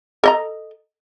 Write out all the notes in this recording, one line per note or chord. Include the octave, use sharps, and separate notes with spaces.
A4 D#5 A#5